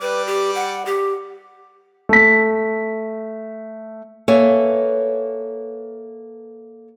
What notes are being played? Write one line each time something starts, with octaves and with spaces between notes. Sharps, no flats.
G3 B4 D5 D6
G4
F#5
G4
A3 B6
A#3 A4 B4 C#5 E5 G#5